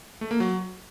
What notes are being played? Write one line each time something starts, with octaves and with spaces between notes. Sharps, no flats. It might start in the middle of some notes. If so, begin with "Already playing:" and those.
A3
A#3
F#3